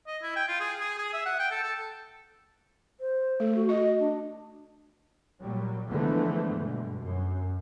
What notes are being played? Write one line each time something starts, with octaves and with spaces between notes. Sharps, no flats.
D#5
E4
G5
F4
G#4
G#4
G#4
E5
F#5
G5
A4
A4
C5
A3 A4
F#4
F#4 D#5
D4
A#2 F#3 G3
D3 E3 F3 G#3 A3 B3
G2 B2 D3
F#2